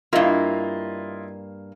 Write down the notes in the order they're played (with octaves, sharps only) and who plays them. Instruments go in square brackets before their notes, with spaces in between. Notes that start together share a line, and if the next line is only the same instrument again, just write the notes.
[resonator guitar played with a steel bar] G2 A#3 [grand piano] E4 F4 D#5